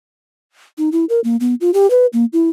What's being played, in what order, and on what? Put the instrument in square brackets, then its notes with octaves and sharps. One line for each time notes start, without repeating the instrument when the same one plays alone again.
[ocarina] D#4
E4
A#4
A#3
B3
F4
G4
B4
A#3
E4